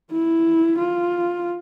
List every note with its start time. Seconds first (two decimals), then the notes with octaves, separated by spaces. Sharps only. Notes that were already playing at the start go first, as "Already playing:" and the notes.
0.12 E4
0.79 F4